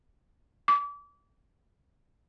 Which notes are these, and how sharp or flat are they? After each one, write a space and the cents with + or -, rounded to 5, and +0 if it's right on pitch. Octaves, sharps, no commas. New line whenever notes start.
D6 -35